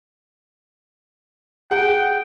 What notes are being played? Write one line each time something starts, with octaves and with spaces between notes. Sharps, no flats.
G#4 F#5 G5